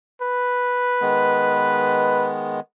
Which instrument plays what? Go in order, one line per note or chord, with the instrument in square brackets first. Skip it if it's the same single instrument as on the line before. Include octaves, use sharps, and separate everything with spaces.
[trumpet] B4
[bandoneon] D#3 G#3 B3